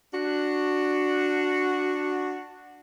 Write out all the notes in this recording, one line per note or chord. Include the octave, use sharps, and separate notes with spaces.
D4 F#4